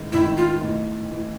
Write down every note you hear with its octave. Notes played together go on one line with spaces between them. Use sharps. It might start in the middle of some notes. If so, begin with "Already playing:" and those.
Already playing: A1 G#2 D#3
A1 G#2 D#3 E4
F4
B1 A2 E3
A2 E3